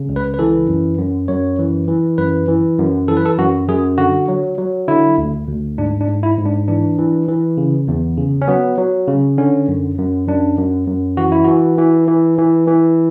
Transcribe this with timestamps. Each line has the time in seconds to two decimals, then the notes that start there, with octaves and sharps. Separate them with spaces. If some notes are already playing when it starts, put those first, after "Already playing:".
Already playing: C#3
0.09 C#2
0.16 B4
0.34 B4
0.39 E3 A4
0.68 F#2
0.98 F#2
1.28 F#2 C#5
1.59 E3
1.88 E3
2.18 F#2 B4
2.48 E3
2.78 F#2
3.08 E3 A4
3.17 B4
3.25 A4
3.38 F#2 F#4
3.68 F#2 G#4
3.98 D3 F#4
4.28 F#3
4.58 F#3
4.88 D3 E4
5.18 D2
5.48 D2
5.78 G#2 D4
6.01 D4
6.08 G#2
6.23 E4
6.38 G#2
6.45 D4
6.68 E3 D4
6.98 E3
7.28 E3
7.57 C#3
7.88 E2
8.18 C#3
8.42 C#4
8.48 F#3 B3
8.78 F#3
9.08 C#3
9.38 D3 C#4
9.68 F#2
9.98 F#2
10.28 F#2 D4
10.58 F#2
10.87 F#2
11.17 E3 F#4
11.32 E4
11.45 E3 F#4
11.78 E3
12.08 E3
12.38 E3
12.67 E3